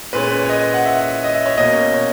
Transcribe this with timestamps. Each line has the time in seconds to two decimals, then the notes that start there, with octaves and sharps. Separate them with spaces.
0.13 A#2 G#3 C#4 B4
0.44 C#5
0.50 D#5
0.74 F#5
0.85 E5
1.24 D#5
1.34 E5
1.46 C#5
1.57 B2 A#3 C#4 D#5
1.94 C#5